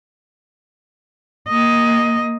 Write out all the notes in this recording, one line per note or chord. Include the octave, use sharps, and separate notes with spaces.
A#3 D#5